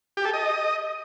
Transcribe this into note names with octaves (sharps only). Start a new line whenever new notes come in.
G4
A4
D#5